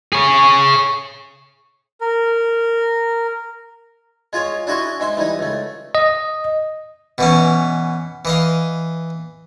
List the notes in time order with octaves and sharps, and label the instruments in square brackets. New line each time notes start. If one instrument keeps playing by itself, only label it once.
[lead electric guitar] G#4 C#5
[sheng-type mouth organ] A#4
[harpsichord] G#3 F4 G#4 C#5
D4 E4 F#4 G#4 C6 C#6
G#2 G#3 E5 C6
E3 G3 D#4
C#2 A3
[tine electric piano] D#5
[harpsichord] B2 E3 C#4
E3 D#5 F5